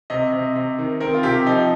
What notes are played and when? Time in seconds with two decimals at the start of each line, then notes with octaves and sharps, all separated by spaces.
0.10 C3 D#5
0.32 C3
0.55 C3
0.79 D#3
1.01 C4 A#4
1.14 F4
1.23 C3 G4
1.46 F3 D#4